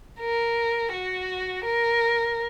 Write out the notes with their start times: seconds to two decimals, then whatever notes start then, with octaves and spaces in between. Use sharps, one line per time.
0.20 A#4
0.92 F#4
1.66 A#4